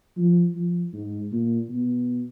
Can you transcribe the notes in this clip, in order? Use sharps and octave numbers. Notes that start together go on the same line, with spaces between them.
F3
F3
G#2
A#2
B2